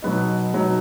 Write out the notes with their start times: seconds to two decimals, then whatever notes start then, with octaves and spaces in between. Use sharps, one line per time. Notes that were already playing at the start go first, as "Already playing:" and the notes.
0.02 B2 F#3 B3 D#4
0.53 B2 F#3 B3 D#4